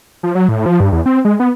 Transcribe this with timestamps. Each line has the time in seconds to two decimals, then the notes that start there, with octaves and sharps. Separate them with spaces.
0.23 F3
0.35 F#3
0.49 A2
0.66 F3
0.80 G2
0.92 E2
1.06 C4
1.25 G#3
1.40 B3